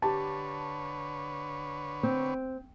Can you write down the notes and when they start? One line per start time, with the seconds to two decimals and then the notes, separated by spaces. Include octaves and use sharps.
0.02 D3 G4 B4 C#5 A5
2.03 C4